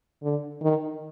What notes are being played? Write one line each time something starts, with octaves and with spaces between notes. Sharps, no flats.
D3
D#3